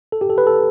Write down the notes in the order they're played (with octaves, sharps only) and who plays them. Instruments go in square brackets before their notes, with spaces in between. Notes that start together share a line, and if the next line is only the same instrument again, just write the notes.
[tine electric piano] A4
G4
A4
B4
A4